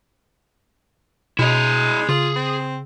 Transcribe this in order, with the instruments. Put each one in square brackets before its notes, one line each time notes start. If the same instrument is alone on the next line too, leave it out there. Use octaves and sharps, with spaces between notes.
[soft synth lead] B2 [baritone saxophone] G#3 [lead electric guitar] E4 D#5
[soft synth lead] C#3 [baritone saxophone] F4 [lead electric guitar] G#4
[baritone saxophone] C4